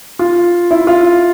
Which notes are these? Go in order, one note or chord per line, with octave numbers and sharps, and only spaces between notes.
F4
E4
F4